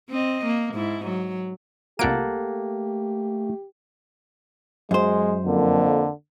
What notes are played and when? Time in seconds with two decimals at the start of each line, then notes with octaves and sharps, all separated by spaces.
0.10 C4 D#5
0.46 A#3
0.75 G#2 E4
1.05 F#3
1.99 C2 A3 A#3 F4 G4 F#5 A5 D7
4.91 F#2 G#3 C5
5.46 F2 D3 A#3